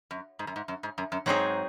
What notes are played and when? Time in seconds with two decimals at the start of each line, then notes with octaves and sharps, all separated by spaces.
0.11 F#2
0.39 G#2
0.47 F#2
0.56 G#2
0.68 F#2
0.83 G#2
0.98 F#2
1.12 F#2
1.26 G#2 F#3 C4 D#4 G#4